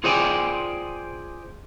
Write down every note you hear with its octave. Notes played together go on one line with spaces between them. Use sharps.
F4 G#4 C5 D5 G5 G#5